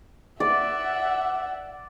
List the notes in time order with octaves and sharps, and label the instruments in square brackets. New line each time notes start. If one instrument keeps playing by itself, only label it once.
[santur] D5 [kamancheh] E5 F#5